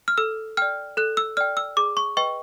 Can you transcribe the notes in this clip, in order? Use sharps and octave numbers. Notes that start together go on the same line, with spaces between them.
F6
A4 E6
D5 G5 F6
A4 F#6
E6
D5 G5 F6
E6
G#4 D6
C#6
B4 D#5 G5 C#6